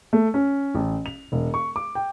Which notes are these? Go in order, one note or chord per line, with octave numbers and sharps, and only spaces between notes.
A3
C#4
A1
F7
E1
C#6
D6
G5